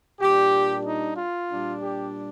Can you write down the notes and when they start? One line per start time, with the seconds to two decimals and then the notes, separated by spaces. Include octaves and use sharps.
0.20 A#2 G3 D4 G4
0.84 D#4
1.16 F4
1.48 A#2 G3 D4
1.80 G4